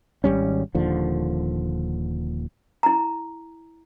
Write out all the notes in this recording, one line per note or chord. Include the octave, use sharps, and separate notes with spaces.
G#1 G#2 G3 C#4
D#1 D#2 D3 F3
E4 A#5